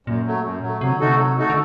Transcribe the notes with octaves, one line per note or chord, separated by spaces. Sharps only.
F#2 A#2
F#3 A3
F#2
F#3 A3
C3 F#3
D3
C3 A3 D#4 F#4 A4
F#3
A3 D#4 F#4 A4
D3